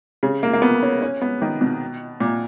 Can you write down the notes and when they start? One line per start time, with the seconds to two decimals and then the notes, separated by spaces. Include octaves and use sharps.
0.23 C#3
0.43 A#3
0.53 A#3
0.62 B3
0.83 C#4
1.02 C#4
1.22 B3
1.42 D#3
1.61 B2
2.20 A#2